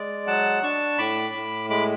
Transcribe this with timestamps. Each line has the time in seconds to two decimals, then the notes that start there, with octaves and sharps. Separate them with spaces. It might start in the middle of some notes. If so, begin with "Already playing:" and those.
Already playing: G#3 D5
0.27 F#3 F#5 A5
0.63 D4 A5 C#6
0.98 A2 B5 D6
1.34 A2
1.70 G#3 B5 D6